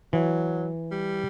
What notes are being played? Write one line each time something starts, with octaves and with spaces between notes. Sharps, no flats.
E3 F#3
G3